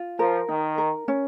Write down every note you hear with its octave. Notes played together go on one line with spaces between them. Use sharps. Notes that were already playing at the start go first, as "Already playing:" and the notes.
Already playing: F4
F3 A#4
D#3 D#4
A#4
C#4